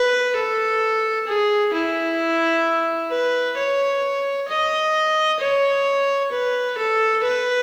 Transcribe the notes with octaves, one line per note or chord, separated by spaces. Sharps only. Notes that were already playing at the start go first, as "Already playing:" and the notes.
Already playing: B4
A4
G#4
E4
B4
C#5
D#5
C#5
B4
A4
B4